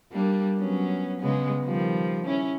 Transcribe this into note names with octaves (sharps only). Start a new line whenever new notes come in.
G3 A#3 D4
F#3 B3 C#4
C#3 G#3 B3
D#3 F3 G3
C#4 E4